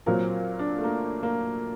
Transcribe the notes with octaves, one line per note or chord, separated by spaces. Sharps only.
A#2 F#3 C4 A#4
D4
A3
A#3
A#3